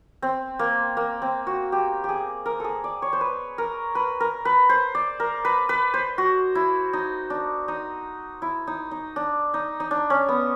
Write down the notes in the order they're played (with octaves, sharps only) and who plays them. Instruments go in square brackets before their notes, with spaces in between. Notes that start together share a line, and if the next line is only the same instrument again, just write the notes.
[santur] C4
A#3
A#3
C4
F#4
G4
G4
G#4
A#4
G#4 A4
D5
C#5
C5
B4
A#4
B4
A#4
B4
C5
D5
A#4
B4
B4
C5
F#4
E4
D#4
D4
D#4
E4
D#4
D#4
D4
D#4
D#4
D4
C#4
B3